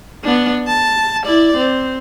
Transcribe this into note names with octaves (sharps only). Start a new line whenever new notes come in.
B3 D4
A5
E4 D5
C4